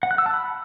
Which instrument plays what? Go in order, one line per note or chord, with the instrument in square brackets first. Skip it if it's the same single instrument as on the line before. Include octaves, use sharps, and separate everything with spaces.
[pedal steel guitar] F#5
F#6
E6
A5
B5